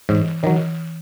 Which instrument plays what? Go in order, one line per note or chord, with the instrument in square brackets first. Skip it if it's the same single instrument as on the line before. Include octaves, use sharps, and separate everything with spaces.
[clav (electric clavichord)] G#2 [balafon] E3
[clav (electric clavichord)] D#3 F#3 [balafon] E3